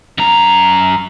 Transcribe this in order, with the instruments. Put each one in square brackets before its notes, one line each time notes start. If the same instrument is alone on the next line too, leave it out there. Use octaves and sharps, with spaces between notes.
[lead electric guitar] F#2 A#5